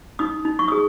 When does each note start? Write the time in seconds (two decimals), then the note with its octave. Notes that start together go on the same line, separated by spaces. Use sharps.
0.19 D#4 D#6
0.45 D#4
0.59 C#6
0.68 G#4 D#6